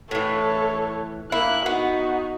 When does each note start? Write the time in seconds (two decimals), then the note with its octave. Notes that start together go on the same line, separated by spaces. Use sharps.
0.11 A2 E3 A4 C#5
1.32 A#3 E4 F#6
1.66 B3 D#4 F#4